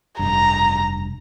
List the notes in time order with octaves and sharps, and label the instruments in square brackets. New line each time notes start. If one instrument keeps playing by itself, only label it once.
[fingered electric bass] F1 G2 [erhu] A#5